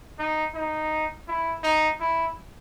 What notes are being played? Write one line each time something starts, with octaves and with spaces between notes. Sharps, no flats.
D#4
D#4
E4
D#4
E4